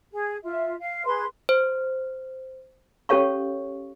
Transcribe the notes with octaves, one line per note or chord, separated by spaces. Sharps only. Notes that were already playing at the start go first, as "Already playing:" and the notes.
G#4
F4 E5
F5
G#4 B4 C6
C5
C#4 G4 A4 C#5 F5 C#6